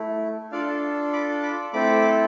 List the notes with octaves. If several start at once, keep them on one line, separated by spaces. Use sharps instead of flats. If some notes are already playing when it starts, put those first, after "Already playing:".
Already playing: A3 E4
D4 F4 A4 D5 F5
B5 D6
B5 D6
A3 C4 E4 A4 B5 D6